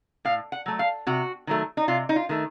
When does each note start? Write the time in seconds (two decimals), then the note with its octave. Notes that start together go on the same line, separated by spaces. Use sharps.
0.25 A2 F5
0.52 F#5
0.66 F#3 A3
0.79 F5
1.07 C3 F#4
1.47 D#3 F#3 A3
1.77 D#4
1.88 C3 F4
2.09 D#4
2.16 F4
2.29 D#3 A3